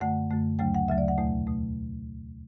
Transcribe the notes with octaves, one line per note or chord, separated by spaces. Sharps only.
F#2 D3 A3 F#5
F#2 D3 A3
D2 C#3 F#3 A3 G5
F#5
D2 C#3 F#3 A3 E5
D5
F#5
E2 B2 A3
B2 A3